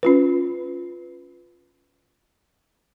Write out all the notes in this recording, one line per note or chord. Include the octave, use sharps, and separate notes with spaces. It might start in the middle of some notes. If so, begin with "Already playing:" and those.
C#4 F4 B4